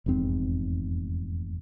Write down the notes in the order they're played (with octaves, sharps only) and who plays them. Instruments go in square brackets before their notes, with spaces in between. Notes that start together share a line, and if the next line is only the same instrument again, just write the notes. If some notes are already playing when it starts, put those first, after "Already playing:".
[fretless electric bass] F1 E2 G#2 C4